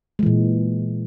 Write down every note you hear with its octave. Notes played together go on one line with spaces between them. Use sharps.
A#2 E3 G#3